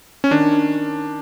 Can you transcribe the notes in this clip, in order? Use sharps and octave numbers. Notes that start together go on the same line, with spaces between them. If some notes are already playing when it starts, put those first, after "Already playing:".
C#4
D#3 D4